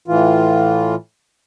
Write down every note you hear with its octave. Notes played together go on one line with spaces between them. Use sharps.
A2 E3 F4